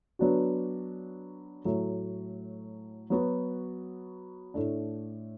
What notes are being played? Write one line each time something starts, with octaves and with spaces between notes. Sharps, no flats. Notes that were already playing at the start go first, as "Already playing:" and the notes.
F#3 B3 D4 F#4
A2 F#3 A3
F#3 B3 F#4
A2 A3 D4